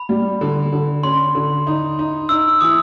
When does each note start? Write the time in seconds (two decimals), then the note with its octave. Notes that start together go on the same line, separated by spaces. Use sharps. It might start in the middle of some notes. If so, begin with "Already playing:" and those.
Already playing: B5
0.09 G3
0.41 D3
0.73 D3
1.03 C#4 C6
1.35 D3
1.67 D#4
1.99 D#4
2.29 D#4 E6
2.61 E3 D#6